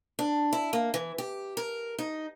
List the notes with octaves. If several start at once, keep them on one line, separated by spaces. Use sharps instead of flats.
D4
E4
A#3
E3
G4
A#4
D#4